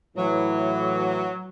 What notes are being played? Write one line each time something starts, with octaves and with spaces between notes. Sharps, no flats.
A2 E3 F#3